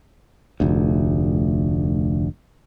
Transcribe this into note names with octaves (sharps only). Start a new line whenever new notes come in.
F1 D2